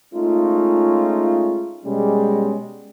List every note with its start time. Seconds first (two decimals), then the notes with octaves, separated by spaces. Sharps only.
0.15 G#3 A3 C#4 D#4 F4
1.86 B2 G3 G#3 C#4